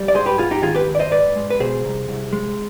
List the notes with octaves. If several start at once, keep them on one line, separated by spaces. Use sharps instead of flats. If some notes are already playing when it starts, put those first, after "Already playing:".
Already playing: G3
D5
G#2 G#4 C5
G4 B4
G#2 F4 G#4
D#4 G4
D#3 F4 G#4
G4 B4
G#2
D5
C5 D#5
G#2 B4 D5
G#3
B4
B2 G#4 C5
C2
C2
G#3